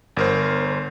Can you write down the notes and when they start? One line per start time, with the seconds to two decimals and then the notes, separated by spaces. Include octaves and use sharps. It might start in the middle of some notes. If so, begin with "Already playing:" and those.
0.17 G1 A#4 C5